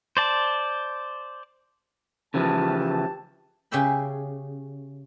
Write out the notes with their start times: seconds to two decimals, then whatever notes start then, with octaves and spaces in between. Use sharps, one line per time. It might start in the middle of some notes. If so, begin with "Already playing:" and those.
0.17 C5 D5 A5
2.34 C#3 E3 F3 G4 A5
3.71 C#3 G4 G#4 E5 G5 B5